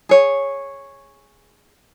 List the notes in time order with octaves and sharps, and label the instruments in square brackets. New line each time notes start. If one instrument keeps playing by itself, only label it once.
[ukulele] G#4 C#5